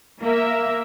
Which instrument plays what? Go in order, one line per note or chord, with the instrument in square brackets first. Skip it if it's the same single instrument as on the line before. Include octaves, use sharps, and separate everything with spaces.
[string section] A#3 A#4 E5